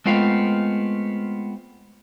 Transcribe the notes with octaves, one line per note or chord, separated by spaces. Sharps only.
G#3 A3 B3 C4 F4 F5